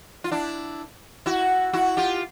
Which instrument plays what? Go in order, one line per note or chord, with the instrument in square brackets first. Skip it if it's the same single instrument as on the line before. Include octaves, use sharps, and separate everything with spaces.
[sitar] F4
D4 E4
E4 F#4
E4 F#4
F4 G4